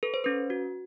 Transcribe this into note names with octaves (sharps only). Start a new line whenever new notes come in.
A4 B4
C5
C#4 B4
F#4